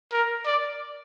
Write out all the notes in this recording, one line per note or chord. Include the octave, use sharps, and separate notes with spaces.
A#4
D5